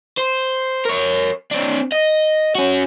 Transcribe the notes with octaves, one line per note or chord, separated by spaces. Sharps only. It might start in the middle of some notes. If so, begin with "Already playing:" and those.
C5
A#4 C#5
C4 D4
D#5
C#4 F#4